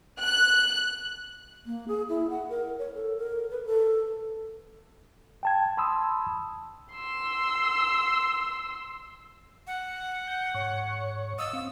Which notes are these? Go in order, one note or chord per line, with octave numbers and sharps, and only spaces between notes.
F#6
A#3
G#4
E4
F#5
A#4
C#5
A4
A#4
B4
A4
G5 A5 G#6
A5 B5 C6 D#6 E6
C6 E6
F#5
G6
G#2 C#5 C#6
D#5 F5 D#6 E6
C4 F5